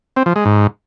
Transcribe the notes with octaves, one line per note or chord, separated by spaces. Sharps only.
C4
F3
G#3
G#2